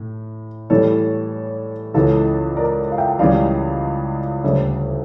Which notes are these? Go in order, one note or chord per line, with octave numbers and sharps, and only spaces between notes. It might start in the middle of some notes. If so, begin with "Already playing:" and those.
Already playing: A2
A2 E3 G3 A4 C#5
C#2 C#3 E3 A4 C#5
A#4 D5
F5
E5 G5
C#2 C#3 E3 G3 D5 F5
D2 C#3 G3 C#5 E5